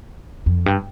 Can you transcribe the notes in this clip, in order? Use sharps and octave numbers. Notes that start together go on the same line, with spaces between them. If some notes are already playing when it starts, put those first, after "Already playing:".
F2
G2